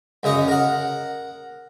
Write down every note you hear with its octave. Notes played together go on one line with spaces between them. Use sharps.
F#2 C#3 D#4 C#6
A#4 F#5